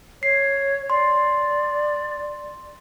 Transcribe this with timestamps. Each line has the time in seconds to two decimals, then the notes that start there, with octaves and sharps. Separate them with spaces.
0.23 C#5 C7
0.90 D5 C6